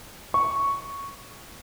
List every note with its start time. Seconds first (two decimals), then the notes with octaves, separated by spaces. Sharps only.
0.34 C#6